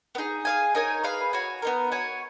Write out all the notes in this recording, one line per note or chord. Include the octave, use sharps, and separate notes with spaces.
B3
D#4 G#4
G#4 B4 F5 G#5
D#4 A#4 C#5 G#5
G#4 B4 F5
F#4 C#5 G#5
B3 D#4 A#4
F#4 C#5 G#5